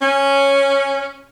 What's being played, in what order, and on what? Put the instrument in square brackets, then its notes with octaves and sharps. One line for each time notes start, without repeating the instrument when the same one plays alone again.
[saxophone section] C#4